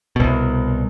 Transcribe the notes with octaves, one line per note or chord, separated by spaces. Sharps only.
C2 B2